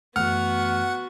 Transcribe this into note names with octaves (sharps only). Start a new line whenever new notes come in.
F#2 E3 A3 B3 F#4 F#5 F6